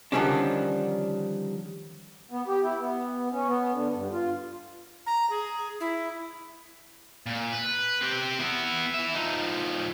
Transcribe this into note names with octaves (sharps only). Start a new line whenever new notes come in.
D3 D#3 F3 G3 C#4 D4
B3
G4
E4
B3
C#4
B3
D3
G2
F4
A#5
G#4
E4
A#2
B4
C4 G4
B3 E4
E3 E5
F3 D#4